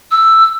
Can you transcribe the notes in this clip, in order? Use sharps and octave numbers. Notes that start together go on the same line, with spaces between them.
E6